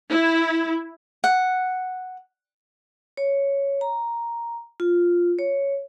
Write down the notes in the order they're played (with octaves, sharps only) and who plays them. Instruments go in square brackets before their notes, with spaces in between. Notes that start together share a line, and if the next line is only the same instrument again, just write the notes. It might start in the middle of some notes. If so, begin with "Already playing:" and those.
[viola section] E4
[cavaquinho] F#5
[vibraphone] C#5
A#5
F4
C#5